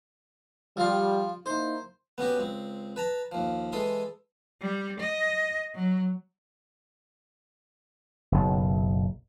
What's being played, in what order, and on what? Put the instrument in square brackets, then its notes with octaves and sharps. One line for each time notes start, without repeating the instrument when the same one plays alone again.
[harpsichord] F3 F4 [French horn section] G3
[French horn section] A#3 D#4 E4 [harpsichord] C5
[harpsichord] B3 C#4 F#4 G4
C#2 C4
B4 A5 A#5
D#2 F3
E3 G#3 A4 C6 D#6
[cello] G3
D#5
F#3
[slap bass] F#1 B1